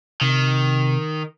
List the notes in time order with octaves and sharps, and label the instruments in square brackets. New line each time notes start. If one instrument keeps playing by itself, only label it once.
[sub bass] C3 [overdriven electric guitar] D#3